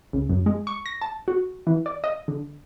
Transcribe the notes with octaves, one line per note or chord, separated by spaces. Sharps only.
C#2
F#2
G#3
C#6
A#6
A5
F#4
E3
D5
D#5
D3